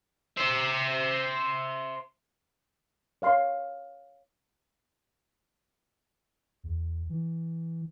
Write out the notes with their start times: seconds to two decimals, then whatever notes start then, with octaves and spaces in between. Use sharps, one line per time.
0.37 C5 E5
3.22 C#5 F5 C6
6.64 E2
7.10 E3